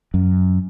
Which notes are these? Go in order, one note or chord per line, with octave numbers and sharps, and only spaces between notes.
F#2